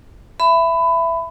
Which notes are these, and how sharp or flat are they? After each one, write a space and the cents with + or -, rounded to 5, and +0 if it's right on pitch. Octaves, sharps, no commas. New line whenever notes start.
E5 +15 B5 +20